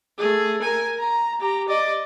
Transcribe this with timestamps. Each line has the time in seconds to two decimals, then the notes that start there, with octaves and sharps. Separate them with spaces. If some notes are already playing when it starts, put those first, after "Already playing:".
0.19 A3 G#4
0.62 A#4 G#5
0.99 A#5
1.40 G4 A#5
1.68 D5 D#5